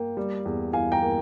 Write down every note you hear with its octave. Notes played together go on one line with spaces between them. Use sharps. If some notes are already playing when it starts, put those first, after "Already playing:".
Already playing: A#3 G5
G3
E2
E3 F5 G#5
G5 A#5
A#3